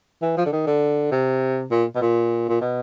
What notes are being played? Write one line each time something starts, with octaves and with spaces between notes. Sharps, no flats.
E3
F3
D3
D#3
D3
C3
A#2
B2
A#2
A#2
B2